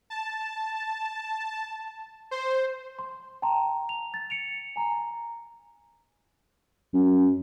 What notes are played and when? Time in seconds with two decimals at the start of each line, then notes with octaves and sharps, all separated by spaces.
0.10 A5
2.31 C5
2.99 C6
3.42 G5 A5 A#5 C6
3.89 F7
4.14 A6
4.30 C#7 D7 F7
4.76 G#5 A#5
6.93 F#2